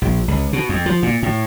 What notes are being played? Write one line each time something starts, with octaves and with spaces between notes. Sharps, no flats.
A#1
C#2
B2
F2
F3
A#2
A2